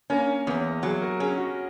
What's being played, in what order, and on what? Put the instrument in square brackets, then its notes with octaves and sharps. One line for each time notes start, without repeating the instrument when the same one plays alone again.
[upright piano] A#3 [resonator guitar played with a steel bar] C#4
[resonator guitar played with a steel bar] E2 [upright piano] B3
[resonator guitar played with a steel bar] F#3 [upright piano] G#4
[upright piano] A#4
[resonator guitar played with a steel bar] C#4 [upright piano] G#4
[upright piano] F#4